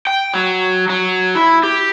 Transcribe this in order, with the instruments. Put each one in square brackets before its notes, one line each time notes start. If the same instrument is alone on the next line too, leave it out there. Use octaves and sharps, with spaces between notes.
[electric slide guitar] G5
F#3
F#3
E4
G4